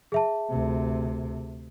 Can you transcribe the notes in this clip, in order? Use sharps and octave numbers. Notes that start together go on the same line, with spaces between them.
G#4 E5 A5
D2 C3